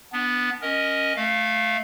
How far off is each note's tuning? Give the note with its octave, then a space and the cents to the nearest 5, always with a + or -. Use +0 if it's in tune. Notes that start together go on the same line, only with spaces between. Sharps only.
B3 +0 D4 +0
C#4 +0 A#4 +0 D#5 +0
A3 -15 F5 +0